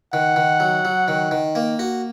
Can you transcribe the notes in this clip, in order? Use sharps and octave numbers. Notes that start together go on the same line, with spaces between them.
D#3 F#5
D#3
F#3
F#3
D#3
D#3
A#3
F#4